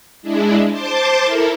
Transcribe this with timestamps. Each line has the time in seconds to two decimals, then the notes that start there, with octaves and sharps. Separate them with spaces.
0.22 G#3 D4 E4
0.70 C5 A5 C6 D6
1.23 E4 A4 A#4